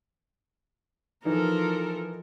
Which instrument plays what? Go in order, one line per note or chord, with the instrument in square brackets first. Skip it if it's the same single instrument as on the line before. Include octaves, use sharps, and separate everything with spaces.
[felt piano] E3 D#4 [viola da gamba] F3 A4 A#4